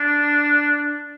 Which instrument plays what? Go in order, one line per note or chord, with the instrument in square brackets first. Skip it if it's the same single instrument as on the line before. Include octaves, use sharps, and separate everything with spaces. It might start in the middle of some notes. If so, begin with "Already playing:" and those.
Already playing: [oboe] D4